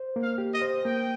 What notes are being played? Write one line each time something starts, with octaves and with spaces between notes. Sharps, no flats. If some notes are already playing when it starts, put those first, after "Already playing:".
Already playing: C5
A#3
F5
G4
D#5
C5
A#3 G5